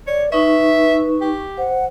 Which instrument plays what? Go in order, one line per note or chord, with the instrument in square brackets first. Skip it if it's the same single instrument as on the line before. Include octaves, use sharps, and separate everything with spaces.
[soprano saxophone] C#5 [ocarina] D5
[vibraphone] D#4 C#6 [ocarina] B4 [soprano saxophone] E5
[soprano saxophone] G4
[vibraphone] C5 [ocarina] F#5